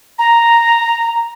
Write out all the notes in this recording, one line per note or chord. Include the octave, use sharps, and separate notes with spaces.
A#5